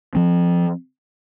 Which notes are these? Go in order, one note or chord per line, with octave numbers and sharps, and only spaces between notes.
F3 C4